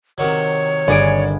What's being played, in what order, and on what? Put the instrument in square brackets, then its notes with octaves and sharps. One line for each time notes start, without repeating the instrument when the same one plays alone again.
[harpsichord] C3 D#3 F#3 [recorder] C#5
[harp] G1 G#4 D7 [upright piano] D5 G#5